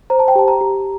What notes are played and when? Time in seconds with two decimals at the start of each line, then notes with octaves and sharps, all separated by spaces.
0.10 C5 A#5
0.19 A5
0.28 G5
0.35 G4 A5
0.48 A#5
0.61 G4